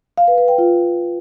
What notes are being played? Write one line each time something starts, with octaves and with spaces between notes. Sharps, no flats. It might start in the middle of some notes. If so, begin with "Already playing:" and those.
F5
B4
B4
G5
F4